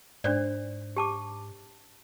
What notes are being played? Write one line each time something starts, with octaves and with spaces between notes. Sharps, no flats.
G#2 D4 C5 D5
G4 A5 D6